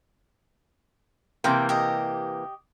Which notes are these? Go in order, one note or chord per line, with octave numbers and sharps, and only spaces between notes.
C3 E3 A#3 G5
G4 D#5